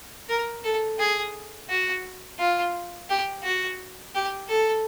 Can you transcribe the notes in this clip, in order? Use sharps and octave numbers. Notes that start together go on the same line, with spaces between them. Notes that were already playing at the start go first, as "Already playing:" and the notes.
A#4
A4
G#4
F#4
F4
G4
F#4
G4
A4